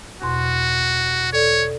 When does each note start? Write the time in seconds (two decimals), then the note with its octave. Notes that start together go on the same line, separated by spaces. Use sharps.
0.22 E2 B2 F#4 C6
1.33 A4 C#5 D5